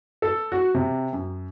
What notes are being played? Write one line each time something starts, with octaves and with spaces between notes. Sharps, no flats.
A4
F#4
C3
F#2